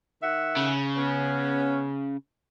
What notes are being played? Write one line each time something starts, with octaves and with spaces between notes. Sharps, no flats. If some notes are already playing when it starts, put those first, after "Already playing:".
D#3 E5 F#5
C#3
B3 C#4